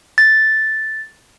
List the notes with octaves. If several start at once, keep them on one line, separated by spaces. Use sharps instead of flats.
A6